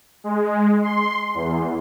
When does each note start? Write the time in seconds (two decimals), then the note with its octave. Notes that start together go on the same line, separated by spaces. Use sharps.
0.24 G#3
0.82 C6
1.35 E2